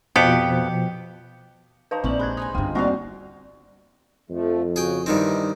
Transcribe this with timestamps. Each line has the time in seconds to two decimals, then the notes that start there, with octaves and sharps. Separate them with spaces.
0.16 F2 B2 F3 B3 G4 F#5
1.91 D#4 B4 C5 F5 A5 D6
2.04 A#1 D3 A#3 C4 E4 C#6 F#7
2.19 G#3 G4 B5 F#6 G#6
2.37 D#4 B4 G#5 D#6
2.55 G1 G2 C3 F4 G5
2.75 G3 A#3 C4 D4 D#4 F#4 C5 F5
4.30 F2 F3 A3
4.76 C#3 F#4 G#4 G5
5.06 G2 D#3 E3 C4 D#4